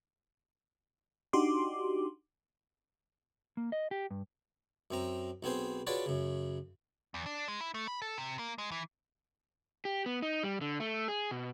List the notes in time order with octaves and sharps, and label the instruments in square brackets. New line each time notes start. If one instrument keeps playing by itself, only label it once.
[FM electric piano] D4 D#4 F#4 G4 C6 D6
[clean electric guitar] A#3
D#5
G4
G2
[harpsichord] F#2 C4 A#5
B1 B3 C4 G#4 C5
F4 F#4 G#4 B4 C#5 D5
F#2 C#3
[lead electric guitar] E2
D4
G#3
E4
A3
B5
A4
C3
A#3
G#3
E3
[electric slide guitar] G4
B3
D#4
G3
D3
A3
G#4
B2